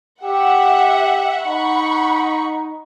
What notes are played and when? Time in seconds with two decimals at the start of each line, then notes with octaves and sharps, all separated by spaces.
0.23 G4 E5 F#5
1.46 D#4 F#5 B5 C#6